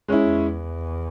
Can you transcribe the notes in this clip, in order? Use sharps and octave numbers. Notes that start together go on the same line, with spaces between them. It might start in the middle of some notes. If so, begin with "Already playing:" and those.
G#3 C#4 E4
E2